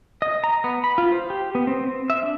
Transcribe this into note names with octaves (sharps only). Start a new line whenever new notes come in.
D#5
A#5
B3
B5
F4
C5
G4
B3
C4
C4
E5
D4